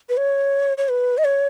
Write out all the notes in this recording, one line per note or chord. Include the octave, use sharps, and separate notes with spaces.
B4
C#5
C#5
B4
D#5
C#5